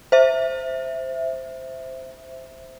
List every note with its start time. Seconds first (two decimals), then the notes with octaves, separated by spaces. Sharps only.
0.12 C5 E5